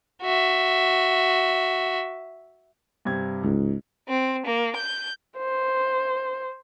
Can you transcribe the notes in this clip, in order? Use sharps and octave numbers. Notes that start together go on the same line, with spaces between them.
F#4 E5
G2 C3 G#6
C#2 G#2
C4
A#3
G6
C5